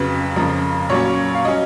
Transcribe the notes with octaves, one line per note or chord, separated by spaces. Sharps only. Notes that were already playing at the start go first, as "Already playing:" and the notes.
Already playing: F2 C#3 F#3 B4
F2 C#3 F3 A#4
A#2 F#3 C#4 C#5
F5
F#3 C#4 D#5